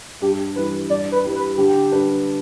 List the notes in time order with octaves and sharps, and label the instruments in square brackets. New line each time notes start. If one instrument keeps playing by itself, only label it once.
[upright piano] G2 [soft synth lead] G4
[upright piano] E3 G3 E4 [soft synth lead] B4
[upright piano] G2 [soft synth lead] D5
[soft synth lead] B4
[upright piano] G3 E4 G4
[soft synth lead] B4
[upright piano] D3 [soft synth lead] G4
[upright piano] G3 D4 B4